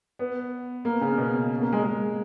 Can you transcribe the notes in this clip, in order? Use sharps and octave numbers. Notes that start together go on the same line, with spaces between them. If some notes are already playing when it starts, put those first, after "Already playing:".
B3
A#3
C#3
B2
A#3
G#3
G#3